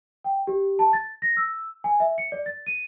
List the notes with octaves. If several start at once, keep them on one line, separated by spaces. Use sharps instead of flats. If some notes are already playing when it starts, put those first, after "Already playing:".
G5
G4
A5
A6
A#6
E6
G#5
E5
C#7
D5
A6
D#7